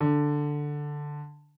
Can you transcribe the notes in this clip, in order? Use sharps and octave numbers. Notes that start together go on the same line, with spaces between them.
D3